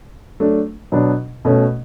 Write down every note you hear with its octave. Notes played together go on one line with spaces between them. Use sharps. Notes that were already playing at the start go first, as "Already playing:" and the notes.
F#3 A3 D4
B2 F#3 B3 D4
B2 A3 C#4